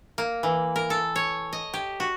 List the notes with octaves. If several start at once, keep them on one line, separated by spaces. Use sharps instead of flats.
A#3
E3
A#4
A4
C#5
D#5
G4
F#4